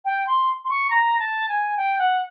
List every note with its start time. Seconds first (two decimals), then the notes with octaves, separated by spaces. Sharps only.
0.05 G5
0.27 C6
0.65 C6
0.70 C#6
0.90 A#5
1.19 A5
1.49 G#5
1.77 G5
1.99 F#5